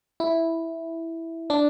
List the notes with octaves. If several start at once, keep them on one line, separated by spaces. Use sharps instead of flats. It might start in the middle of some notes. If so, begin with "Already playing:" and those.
E4
D4